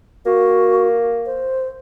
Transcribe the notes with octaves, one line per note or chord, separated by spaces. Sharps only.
A#3 F#4
C5